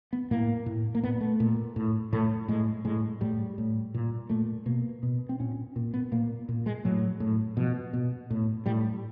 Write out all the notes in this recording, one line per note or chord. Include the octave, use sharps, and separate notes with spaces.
B3
A2 A#3
A2
A#3
A#2 B3
A3
A#2
A2
A2 A3
A2 G#3
A2 G#3
A2 G3
A2
A#2
A#2 A3
B2 A#3
B2
C4
A#2 C#4
A#2
B3
A#2 A#3
A#2
G#3
A2 F#3
A2
B2 F3
B2
A2
A2 G3